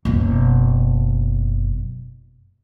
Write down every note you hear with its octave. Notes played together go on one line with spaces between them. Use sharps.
F#1 B2